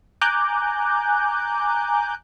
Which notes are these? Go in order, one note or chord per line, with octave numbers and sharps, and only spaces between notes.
G#5 A#5 D6 F#6 G6